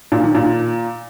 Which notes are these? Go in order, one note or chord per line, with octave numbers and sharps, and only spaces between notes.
A#2
D#3
A#2